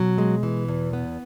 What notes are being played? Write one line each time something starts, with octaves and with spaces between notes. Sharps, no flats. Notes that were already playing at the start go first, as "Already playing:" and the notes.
Already playing: B2 F#3
G#3
E3
E2
B3